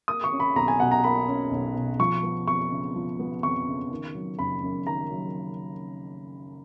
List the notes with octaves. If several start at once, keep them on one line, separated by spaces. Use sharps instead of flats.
A#3 D#6
C#6
C#4
B5
B1 A#5
G#5
B2 F#5
A#5
A#3 B5
C#4
B1
B2
F3 C#6
B3
F2 C#6
C#3
F3
B3
F2 C#6
C#3
D#3
F#3
F#1 B5
F#2
D#3 A#5
F#3